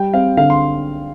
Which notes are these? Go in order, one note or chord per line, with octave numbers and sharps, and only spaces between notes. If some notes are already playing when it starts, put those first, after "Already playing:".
Already playing: G3 G5
C4 F5
D3 F5
C6